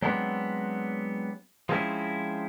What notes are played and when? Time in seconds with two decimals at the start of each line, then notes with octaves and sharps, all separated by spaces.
0.02 F#3 G#3 B3 C4 D4
1.69 F3 G#3 C4 C#4 E4